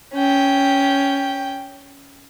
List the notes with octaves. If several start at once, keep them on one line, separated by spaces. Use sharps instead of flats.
C#4 G5